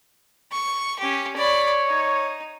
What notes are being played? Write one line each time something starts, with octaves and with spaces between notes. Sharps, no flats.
C#6
C#4 G4
C#5 D5 B5
D#4